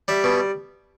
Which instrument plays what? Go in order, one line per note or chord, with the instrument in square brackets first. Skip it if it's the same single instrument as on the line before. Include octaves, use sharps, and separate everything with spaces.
[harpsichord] G3 E5
B2